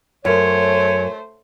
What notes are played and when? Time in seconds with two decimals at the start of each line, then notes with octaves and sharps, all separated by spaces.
0.25 F#2 A3 C5 C#5